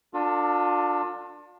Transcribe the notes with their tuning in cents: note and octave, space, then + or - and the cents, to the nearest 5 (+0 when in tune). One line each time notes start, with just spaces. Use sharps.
D4 +10 F4 +35 A4 +45